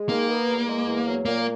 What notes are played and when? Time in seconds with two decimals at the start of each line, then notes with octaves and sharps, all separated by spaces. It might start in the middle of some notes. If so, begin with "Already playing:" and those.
Already playing: G#3
0.09 D#3 A#3
0.29 B3
0.47 E2
0.67 G#3
0.86 E2
1.06 F#3
1.25 A#2 A#3